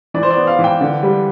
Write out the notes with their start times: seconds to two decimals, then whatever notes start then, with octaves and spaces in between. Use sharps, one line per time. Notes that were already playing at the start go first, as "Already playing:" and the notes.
0.14 E3 D5
0.23 C5
0.31 D5
0.37 B3
0.47 F5
0.59 E3
0.64 G5
0.81 D3
1.03 G3